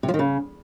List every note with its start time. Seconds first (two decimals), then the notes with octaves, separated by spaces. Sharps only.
0.03 C3
0.08 F3
0.14 D#3
0.19 C#3